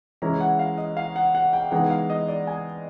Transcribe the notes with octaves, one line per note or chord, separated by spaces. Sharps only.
E3 G#3 C#4 E4 A#5
F#5
F5
D#5
F5
F#5
F#5
G5
E3 G#3 B3 D#4 F#5
F5
D#5
D5
G#5